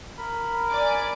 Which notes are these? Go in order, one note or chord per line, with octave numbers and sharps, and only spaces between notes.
A#4 B5
D5 G#5 D6